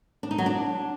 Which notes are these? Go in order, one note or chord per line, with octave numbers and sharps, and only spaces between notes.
D4
D#4
F#3
D4